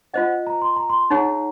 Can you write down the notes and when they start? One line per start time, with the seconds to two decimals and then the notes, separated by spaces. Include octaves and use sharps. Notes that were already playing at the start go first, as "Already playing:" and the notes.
0.14 F4 C5 D#5 F#5
0.47 A#5
0.62 C6
0.76 A#5
0.89 C6
1.10 D#4 G#4 C#5 F#5 A#5